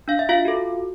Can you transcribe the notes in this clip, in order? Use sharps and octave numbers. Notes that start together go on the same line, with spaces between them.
D4 F5
E5
F4 F5
F#4 A4